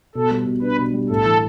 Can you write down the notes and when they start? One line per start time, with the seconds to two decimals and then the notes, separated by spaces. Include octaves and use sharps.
0.15 B2 A4
0.31 G3
0.46 B2
0.62 D4 B4
0.78 B2
0.94 G3
1.09 A2 A4
1.25 E3